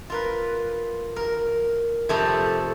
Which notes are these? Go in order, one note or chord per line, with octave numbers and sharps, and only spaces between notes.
F4 A#4 B4
A#4
F2 C3 A3 D5 A#5 B5